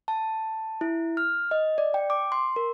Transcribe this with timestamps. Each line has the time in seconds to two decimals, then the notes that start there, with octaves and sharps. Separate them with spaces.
0.08 A5
0.81 E4
1.17 F6
1.51 D#5
1.78 D5
1.94 G5
2.10 D6
2.32 C6
2.56 A#4